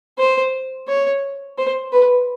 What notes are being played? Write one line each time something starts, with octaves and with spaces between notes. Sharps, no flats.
C5
C#5
C5
B4